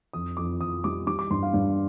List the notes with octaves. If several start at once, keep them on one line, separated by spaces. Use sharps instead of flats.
F2 D#6
F2 D6
F2 D#6
G3 D6
G3 D6
D6
G2 C6
F5
G2